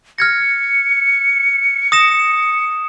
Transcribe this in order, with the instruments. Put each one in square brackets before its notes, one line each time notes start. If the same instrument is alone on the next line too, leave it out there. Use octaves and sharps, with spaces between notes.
[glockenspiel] F6 G#6 A#6 [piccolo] C#7
[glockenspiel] D#6 A#6 E7